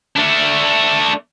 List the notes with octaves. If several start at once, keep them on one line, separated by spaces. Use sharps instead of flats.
A3 D4